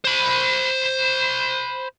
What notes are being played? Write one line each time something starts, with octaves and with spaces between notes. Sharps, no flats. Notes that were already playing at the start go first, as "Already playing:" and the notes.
C5 B5